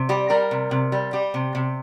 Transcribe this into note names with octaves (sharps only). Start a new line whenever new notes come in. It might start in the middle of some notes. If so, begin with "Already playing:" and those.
Already playing: C3
G3 G4
G3 A#4
C3
C3
G3
G3 G4
C3
C3